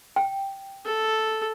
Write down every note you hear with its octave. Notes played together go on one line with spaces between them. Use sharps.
G5
A4